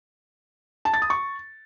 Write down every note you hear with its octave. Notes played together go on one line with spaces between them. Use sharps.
A5
A6
D#6
C#6